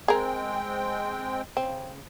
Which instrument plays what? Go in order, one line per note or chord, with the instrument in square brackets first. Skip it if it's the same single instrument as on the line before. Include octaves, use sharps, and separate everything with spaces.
[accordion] G#3 C4 G5 [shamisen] G#4 A#4
[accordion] C#3 [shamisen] C4